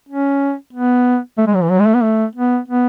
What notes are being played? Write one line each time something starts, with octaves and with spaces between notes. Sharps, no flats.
C#4
B3
A3
G#3
F#3
E3
F#3
G#3
A3
B3
A3
B3
B3